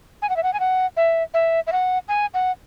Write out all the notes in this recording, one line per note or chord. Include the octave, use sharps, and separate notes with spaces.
G#5
F#5
E5
F#5
G#5
F#5
E5
E5
E5
F#5
G#5
F#5